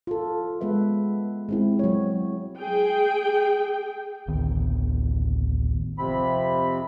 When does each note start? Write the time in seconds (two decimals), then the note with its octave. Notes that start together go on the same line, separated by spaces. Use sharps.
0.07 F4 A4
0.61 G#3 B3 B4 E5
1.49 G#3 C4 E4
1.79 F#3 C#5
2.59 G#4 G5
4.27 A1 D2 D#3 B3
5.99 F2 C3 C4 B5